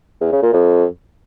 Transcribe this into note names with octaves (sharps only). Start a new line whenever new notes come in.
E2
C#3
A#2
F2